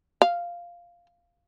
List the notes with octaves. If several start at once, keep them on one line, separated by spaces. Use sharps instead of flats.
F5